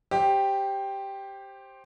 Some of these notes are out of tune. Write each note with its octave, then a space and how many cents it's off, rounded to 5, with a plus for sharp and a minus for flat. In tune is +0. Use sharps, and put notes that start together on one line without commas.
G4 +0 C5 +15